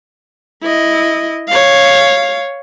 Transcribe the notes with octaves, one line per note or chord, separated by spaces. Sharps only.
E4 D#5
C#5 F5